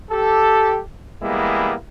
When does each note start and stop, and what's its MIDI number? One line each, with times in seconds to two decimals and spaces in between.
0.11 0.78 67
0.11 0.78 69
1.22 1.74 52
1.22 1.74 55
1.22 1.74 56
1.22 1.74 58
1.22 1.74 59
1.22 1.74 64